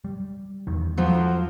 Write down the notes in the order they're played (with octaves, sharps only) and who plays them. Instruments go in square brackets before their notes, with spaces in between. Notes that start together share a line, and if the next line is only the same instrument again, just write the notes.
[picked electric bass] G3
E2 D#3
[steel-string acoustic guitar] F2 F3 F#3